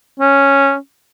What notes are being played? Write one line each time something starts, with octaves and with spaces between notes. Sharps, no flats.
C#4